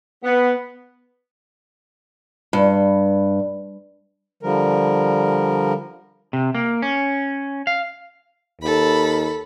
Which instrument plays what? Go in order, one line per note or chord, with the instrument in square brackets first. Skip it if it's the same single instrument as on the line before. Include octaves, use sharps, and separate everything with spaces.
[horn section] B3
[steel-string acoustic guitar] G2
[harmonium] D3 F3 G3 A#4
[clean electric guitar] C3
A#3
C#4
F5
[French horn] D#2 [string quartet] A4 B5